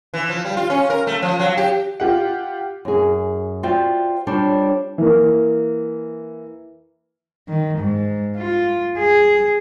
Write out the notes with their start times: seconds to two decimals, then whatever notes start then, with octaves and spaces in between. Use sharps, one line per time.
0.14 E3
0.29 F3
0.45 G3
0.57 F4
0.70 C#4
0.90 A#4
1.07 A3
1.22 F3
1.39 F#3
1.57 G4
2.00 F4 G4 F#5
2.85 F#2 G#4
3.63 F4 F#4 C5 D5 E5 G5
4.27 G3 D4 F4 C5 C#5
4.98 E3 A#3
7.49 D#3
7.78 G#2
8.37 F4
8.98 G#4